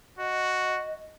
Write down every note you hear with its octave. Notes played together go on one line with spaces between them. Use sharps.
F#4 D#5